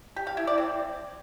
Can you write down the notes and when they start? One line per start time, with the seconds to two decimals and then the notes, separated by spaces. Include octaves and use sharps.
0.16 G4
0.27 F5
0.37 E4
0.47 D5
0.58 C4